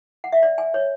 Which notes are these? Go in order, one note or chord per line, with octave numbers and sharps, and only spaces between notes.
F#5
E5
D5
G#5
C#5